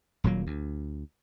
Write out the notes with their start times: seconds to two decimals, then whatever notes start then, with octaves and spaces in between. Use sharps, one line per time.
0.24 D#1 A#2 F#3 A#3
0.47 D2